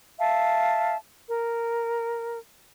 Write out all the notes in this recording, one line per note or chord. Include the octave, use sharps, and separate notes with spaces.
E5 F5 A5
A#4